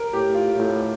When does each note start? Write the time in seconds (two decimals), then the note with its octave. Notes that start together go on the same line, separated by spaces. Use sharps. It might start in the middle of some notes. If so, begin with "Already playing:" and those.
Already playing: A#4
0.13 A2 G4
0.34 F4
0.55 A2